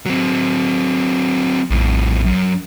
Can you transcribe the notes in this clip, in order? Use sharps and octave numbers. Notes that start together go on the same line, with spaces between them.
F#3 C4
A#1 F2 A2
F#2